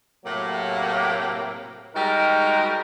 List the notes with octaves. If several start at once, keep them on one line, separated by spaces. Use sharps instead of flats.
A2 C3 F#3 A#3
G3 G#3 D#4 F#4 A#4